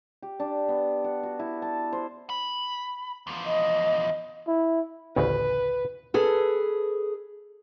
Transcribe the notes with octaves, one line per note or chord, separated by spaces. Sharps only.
G4
D4
B3
F#5
F#4
E4
A5
C5
B5
E2 F3
D#5
E4
A1 D2 C#3 B4
G#4 A4 B4